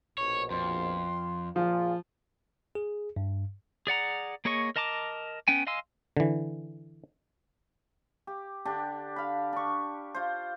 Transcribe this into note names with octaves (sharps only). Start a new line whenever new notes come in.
A#1 B2 C#5
F2 C6
A#2 F3 F4 G#4
G#4
G2
G#4 D5 F#5 A#5
A#3 G#4 C#5 D#5 C#6
A#4 D#5 A5 A#5 D6
B3 C#4 G5 G#5
D#5 F5 G#5 C6 E6
D3 E3
G4
D3 D4 G4
F5 B5
D4 C#6
F4 C5